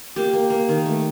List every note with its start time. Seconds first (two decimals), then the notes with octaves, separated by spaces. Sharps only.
0.16 A#3 G4
0.33 A#3
0.50 A#3
0.69 D#3
0.86 A3